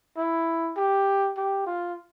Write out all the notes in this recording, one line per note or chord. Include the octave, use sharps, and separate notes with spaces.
E4
G4
G4
F4